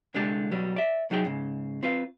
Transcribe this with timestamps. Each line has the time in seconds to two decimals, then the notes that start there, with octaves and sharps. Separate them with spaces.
0.14 C2 D3 G#3 D4 G4 D5
0.51 B2 F#3 G3
0.76 D5 E5
1.10 C2 F#3 D#4 G#4 G5
1.25 G#2 C#3
1.83 C4 F4 B4 F5